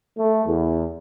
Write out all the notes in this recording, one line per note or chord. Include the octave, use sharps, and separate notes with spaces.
A3
E2